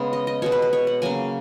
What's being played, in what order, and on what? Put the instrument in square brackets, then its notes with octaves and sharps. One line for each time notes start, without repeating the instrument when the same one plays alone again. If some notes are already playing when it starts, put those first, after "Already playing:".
Already playing: [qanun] C#3 G#3 B3 C#5
D#5
D#5
B2 G#3 B3 C#5
B4
B4
C#5
F#5
C#3 F#3 A#3 G#5